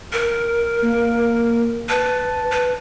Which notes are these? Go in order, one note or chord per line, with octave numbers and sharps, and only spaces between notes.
A#4
A#3
B4 A5
B4